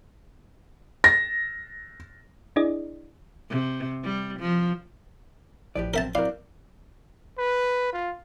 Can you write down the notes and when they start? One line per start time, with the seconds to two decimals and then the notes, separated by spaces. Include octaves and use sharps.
1.04 A#6
2.56 D4 E4 G#4 D5 D#5
3.50 C3
4.04 G3
4.40 F3
5.75 A1 A2 F3 G4 B4 D5
5.94 F#2 C3 C4 A#4 E5 A5
6.15 F#3 C4 E4 G4 A#4 D5 F5
7.38 B4
7.93 F4